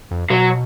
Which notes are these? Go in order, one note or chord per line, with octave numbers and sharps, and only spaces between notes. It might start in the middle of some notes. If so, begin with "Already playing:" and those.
F2
B2 F#3